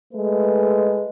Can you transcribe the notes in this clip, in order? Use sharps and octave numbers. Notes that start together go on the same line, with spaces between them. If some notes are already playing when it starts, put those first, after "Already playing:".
G#3 A3 B4